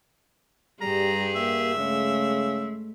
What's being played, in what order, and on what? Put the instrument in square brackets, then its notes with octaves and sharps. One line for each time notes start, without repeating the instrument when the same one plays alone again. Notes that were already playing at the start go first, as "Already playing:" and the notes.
[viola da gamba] G2 G4 G#4 [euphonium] G3 [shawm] A#5
[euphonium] A#3 [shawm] E5
[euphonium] C#3 [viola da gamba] G#3 A3